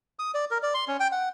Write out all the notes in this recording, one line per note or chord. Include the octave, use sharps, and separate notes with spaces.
D#6
D5
A#4
D5
C6
C#4
G5
F#5